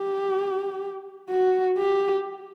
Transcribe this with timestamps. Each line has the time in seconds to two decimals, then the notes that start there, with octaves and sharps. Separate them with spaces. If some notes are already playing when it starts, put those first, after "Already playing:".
Already playing: G4
1.30 F#4
1.78 G4